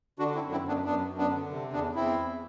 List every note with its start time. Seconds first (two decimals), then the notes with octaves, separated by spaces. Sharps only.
0.19 D3 D4 F#4
0.35 C4 E4
0.41 F#2
0.51 C4 E4
0.63 F#2
0.68 B3 D4
0.85 F#2 B3 D4
1.07 F#2
1.17 B3 D4
1.29 D3
1.51 C3
1.73 E2 B3 D4
1.95 E2 C4 E4
2.18 E2